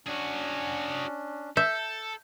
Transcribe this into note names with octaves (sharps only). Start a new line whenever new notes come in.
C#4 D4 F#4 G#4
A4 E5 G6